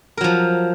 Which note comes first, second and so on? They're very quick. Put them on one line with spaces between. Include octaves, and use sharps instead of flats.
A#4 F#3 F3